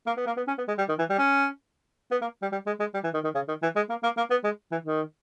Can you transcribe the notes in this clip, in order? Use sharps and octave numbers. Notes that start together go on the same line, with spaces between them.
A#3
B3
A#3
B3
C#4
B3
G#3
G3
D#3
E3
G3
C#4
B3
A#3
G3
G3
G#3
G#3
G3
E3
D#3
D#3
C#3
D#3
E3
G#3
A#3
A#3
A#3
B3
G#3
E3
D#3